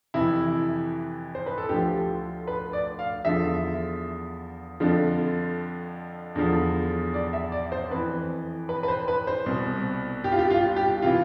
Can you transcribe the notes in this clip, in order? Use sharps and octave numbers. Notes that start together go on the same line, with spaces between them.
F2 C3 E3 E4
C5
B4
A4
D2 D3 F3 G4
B4
D5
F5
E2 D3 F3 E5
F2 D3 F3
E2 D3 F3
D5
E5
D5
C5
F2 E3 B4
B4
B4
C5
B4
C5
C2 B2
G4
F4
G4
F4
G4
C3 E3 F4